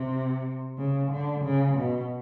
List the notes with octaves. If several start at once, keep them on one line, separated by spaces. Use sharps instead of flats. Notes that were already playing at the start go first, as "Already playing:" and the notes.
Already playing: C3
C#3
D3
C#3
B2